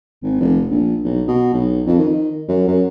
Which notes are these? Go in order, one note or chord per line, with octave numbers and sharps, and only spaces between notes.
G#1
F1
A#1
B1
B2
B1
F2
D#3
F#2
F#2